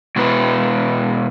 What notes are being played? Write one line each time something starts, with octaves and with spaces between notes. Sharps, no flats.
B2 G#3 B3 E4 B4